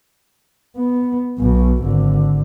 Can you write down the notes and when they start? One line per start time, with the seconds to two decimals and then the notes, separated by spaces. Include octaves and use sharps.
0.76 B3
1.39 B1 B2
1.83 G#1 D3